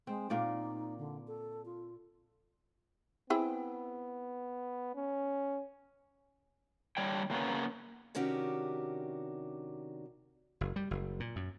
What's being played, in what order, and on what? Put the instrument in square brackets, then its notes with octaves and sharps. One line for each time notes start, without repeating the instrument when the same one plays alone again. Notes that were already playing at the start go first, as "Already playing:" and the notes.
[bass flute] G#3 [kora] C4
[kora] A#2 A#3 D5 [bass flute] D#4
[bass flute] D3
A4
F4
[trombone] B3 [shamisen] C4 E4 G#4
[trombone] C#4
[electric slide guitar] D3 G3 C#5 G5
C#3 A#3 B3 C#4
[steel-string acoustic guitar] C3 D#3 C#4 D4 F#4 G4
[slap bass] F#1
G3
F#1
A#2
F#2